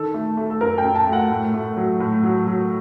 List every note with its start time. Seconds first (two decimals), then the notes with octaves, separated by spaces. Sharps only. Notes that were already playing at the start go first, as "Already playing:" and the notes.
Already playing: D#3 A4
0.14 A3
0.37 A3
0.50 A4
0.61 F#2 A#4
0.78 G5
0.84 F#2
0.95 A5
1.07 A3
1.13 F#5
1.31 A2
1.54 A3
1.77 F#3
2.00 A2
2.23 F#3
2.47 F#3